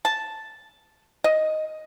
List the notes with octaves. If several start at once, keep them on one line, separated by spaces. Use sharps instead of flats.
A5
D#5